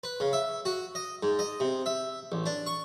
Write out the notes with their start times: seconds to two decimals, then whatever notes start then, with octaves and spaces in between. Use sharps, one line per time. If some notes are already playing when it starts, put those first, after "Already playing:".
0.04 B4
0.20 C#3
0.33 E5
0.65 F#4
0.95 D#5
1.23 G#2
1.39 D#5
1.60 C3
1.86 E5
2.32 A1
2.46 D4
2.66 C#6